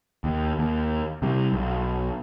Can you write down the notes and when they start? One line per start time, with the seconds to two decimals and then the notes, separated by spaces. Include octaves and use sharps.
0.24 D#2
0.59 D#2
1.22 C3 G3
1.53 B1